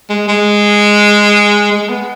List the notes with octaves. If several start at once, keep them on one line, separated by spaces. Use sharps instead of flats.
G#3
G#3
G#3
B3